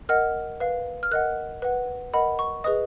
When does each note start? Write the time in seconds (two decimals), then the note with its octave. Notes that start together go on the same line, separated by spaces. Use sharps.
0.09 A#4 D#5 F#5 F6
0.60 B4 F5
1.03 F6
1.11 A#4 D#5 F#5 F#6
1.62 B4 F#5
2.13 A#4 D#5 F#5 B5
2.39 C#6
2.64 G#4 B4 D#5 D#6